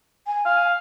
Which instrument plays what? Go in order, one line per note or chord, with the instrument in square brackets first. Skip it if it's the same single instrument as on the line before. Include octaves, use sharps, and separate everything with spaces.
[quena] G#5
[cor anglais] F5 [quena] G#5